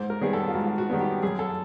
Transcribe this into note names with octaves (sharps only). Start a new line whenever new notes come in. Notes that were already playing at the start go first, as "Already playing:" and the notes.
Already playing: G#2 C5
A#4
D#3 G3 B3 G#4
A4
F4
G#2 F#4
F#4
D#3 G3 B3
G4
F#2 G#4
A4